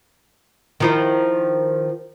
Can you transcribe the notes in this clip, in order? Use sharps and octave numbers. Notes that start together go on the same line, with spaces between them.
D#3 F3 E4